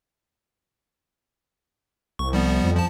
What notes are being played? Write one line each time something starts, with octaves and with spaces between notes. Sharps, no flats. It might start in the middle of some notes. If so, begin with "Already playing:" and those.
C2 C#6
F3 G3 B3
F2
F3 A5